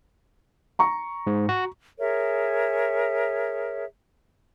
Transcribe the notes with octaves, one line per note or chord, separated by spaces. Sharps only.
A#5 C#6
G#2
F#4
G#4 A#4 C#5 E5